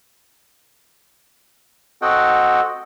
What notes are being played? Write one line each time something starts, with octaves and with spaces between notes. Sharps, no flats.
C4 F#4 A4 D#5 F#5 G5